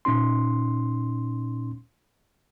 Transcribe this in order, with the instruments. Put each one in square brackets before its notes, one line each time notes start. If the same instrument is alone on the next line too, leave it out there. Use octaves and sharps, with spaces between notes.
[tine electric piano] A#2 C#4 D#4 C6